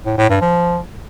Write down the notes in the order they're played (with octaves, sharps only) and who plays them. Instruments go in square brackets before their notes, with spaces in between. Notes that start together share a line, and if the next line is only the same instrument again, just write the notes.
[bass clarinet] A2
A2
G2
F3